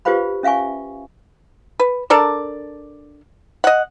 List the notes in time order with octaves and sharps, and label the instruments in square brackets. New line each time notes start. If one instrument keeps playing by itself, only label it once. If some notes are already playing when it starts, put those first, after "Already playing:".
[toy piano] F4 G4 B4 C5 F5 B5
C#4 E5 F5 G#5 C#6
[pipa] B4
D4 A4 A#4 D5
D#5 F#5